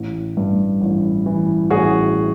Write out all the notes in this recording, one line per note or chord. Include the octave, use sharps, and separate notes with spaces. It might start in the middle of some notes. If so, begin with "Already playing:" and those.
Already playing: A1
G2
A1
E3
A1 F#4 G#4